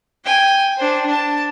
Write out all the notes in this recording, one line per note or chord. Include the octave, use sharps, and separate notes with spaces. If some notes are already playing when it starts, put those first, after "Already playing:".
G5 G#5
D4 C5
D4 A5